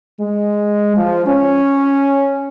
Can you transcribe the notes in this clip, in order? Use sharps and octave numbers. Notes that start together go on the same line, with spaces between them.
G#3
F3
C#4